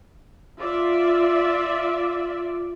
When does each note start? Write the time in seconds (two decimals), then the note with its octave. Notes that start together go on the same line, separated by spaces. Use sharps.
0.60 F4 D5 E5